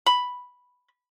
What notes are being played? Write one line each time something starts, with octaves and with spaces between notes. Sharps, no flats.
B5